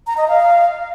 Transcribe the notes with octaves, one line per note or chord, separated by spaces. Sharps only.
A#5
D#5
F5